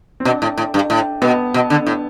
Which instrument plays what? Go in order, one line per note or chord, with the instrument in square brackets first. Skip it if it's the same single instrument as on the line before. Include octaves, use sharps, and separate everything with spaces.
[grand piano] C4
[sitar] B2 [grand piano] D4
[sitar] A2
A2
G2
A2
[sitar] B2 [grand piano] B3
[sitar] B2
D3
A2